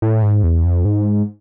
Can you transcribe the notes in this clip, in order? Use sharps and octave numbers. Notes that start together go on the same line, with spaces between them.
A2
G#2
E2
F2
G#2